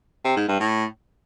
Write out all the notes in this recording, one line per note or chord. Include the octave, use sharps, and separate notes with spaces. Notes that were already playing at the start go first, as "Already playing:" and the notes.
C3
G#2
G2
A2